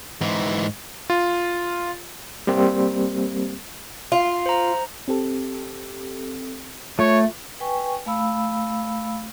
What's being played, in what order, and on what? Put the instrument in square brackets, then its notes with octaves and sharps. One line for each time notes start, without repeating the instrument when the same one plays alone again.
[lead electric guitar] G#2 E3
[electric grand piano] F4
[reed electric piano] G3 A#3 C4 G4
[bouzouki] F4
[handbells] C5 A#5
[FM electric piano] C4 G4 A4
[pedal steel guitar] A3 [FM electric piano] F4 [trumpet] C#5
[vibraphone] B4 G5 G#5 C#6
A3 F5 B5 E6